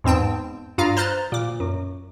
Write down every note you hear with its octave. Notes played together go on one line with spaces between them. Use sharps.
E2 G#2 C4 G5 A5
G2 F4 F5 A#5 A#6
C5 A#5 F6 F#6 A6
A#2 D6
F#2